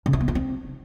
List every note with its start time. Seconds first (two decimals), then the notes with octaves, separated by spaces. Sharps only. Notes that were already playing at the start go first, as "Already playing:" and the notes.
0.06 C#3
0.13 E4
0.21 B3
0.28 F4
0.35 C4